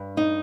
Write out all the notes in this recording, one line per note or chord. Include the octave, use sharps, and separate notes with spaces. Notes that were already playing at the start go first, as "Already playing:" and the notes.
Already playing: G2
D#4